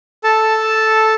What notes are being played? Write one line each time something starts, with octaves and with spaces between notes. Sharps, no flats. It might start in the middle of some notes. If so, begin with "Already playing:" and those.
A4 A5